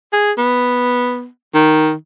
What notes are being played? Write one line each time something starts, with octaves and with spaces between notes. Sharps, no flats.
G#4
B3
D#3